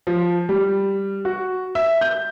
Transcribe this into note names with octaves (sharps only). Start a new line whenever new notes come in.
F3
G3
F#4
E5
G6